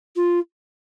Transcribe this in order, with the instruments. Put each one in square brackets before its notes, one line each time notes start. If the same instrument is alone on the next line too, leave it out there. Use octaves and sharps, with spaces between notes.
[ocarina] F4